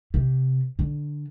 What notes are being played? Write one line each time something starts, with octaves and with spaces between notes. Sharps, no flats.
C3
D3